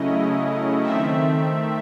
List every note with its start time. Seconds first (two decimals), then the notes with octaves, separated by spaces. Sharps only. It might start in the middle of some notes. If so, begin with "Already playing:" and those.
Already playing: C#3 F#3 A3 C#4 E4 D#5
0.83 D#3 A3 C4 E5